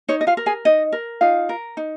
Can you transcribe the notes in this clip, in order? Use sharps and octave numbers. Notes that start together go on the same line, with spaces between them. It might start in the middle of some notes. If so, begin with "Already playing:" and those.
D#4 C#5
D#5
F4 F5
A#4
G#4 G#5
D#4 D#5
A#4
D#4 F4 F5
A#4
D#4